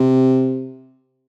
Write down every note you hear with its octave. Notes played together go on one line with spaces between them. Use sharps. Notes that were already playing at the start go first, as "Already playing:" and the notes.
Already playing: C3